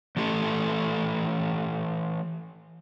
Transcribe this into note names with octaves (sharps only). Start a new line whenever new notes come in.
E3 A3 G4 A4